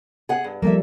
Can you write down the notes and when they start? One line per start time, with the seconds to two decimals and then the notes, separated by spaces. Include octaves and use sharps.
0.29 G#4 F#5
0.44 G2
0.62 F3 G3 A#3 A4 E5